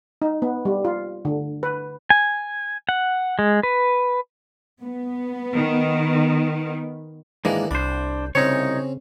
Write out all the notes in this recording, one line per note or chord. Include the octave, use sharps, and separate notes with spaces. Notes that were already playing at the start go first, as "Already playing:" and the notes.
D#4
B3
G3
F4
D3
B4
G#5
F#5
G#3
B4
B3
D#3
G#2 D#3 E3 G#3 A#3 D4
C2 D4 C5 B5
C2 C#3 C4 C#4 D#4 C#5